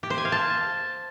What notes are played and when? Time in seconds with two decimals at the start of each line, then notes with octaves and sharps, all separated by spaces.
0.03 G4
0.10 C5
0.18 G#5
0.25 F5
0.32 A5